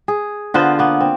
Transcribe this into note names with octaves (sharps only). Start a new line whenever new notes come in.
G#4
D3 B3 F4 C5
A#3 B3
C4